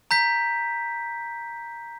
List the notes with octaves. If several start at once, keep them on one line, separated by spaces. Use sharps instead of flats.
A#5 G6 B6